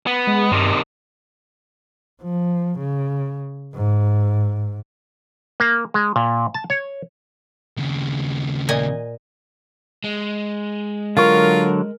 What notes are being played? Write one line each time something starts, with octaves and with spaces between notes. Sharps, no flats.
B3
G#3
G2 C3 D#3
F3
C#3
G#2
A#3
G#3
A#2
A5
C#5
D#2 C#3
A#2 D#5 G#5
G#3
D3 F#3 F4 A#4 C#6